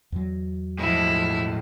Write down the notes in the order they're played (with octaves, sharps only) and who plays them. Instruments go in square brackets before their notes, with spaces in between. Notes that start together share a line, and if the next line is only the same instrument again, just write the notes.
[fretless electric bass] E2 F#3
[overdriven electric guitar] A2 G#3 [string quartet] F3 E4